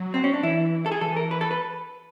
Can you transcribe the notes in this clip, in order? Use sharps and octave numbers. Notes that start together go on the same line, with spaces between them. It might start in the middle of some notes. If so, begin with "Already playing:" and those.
Already playing: F#3
C4
C#4
D4
E3 E4
A4
G#4
E3 A4
A#4
B4
A4
B4